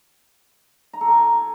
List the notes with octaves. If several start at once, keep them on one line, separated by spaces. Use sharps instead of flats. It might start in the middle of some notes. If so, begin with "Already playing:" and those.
A#5
A4
G#5